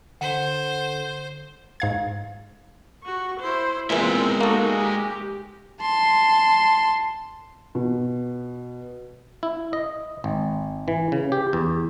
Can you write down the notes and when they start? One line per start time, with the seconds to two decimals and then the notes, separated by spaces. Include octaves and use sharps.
0.21 D3 C5 F#5
1.80 G#2 F5 G#6
3.03 F#4 C#6
3.40 E4 C5
3.90 A#2 E3 G#3 C4 A#4 E5
4.41 A#3 D#4 F#4 A4
4.78 G4
5.81 A5 C6
7.75 B2
9.43 E4
9.73 D#5
10.24 G#1
10.88 E3
11.12 C#3
11.32 G4
11.53 E2